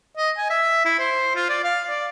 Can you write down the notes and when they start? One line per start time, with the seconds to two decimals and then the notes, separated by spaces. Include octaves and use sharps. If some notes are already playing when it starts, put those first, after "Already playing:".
0.17 D#5
0.37 G#5
0.50 E5
0.85 E4
0.99 C5
1.35 F4
1.50 D5
1.64 F5
1.90 D5